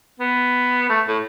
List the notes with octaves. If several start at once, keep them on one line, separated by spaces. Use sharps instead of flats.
B3
A3
A2